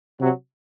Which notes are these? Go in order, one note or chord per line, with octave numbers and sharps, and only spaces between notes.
C3 F#3